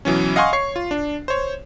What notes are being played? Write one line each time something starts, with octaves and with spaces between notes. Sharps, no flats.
B2 E3 F#3 C#4
D#5 F5 F#5 G#5 C6 C#6
C#5 C#6 C7
F4
D4
C5 C#5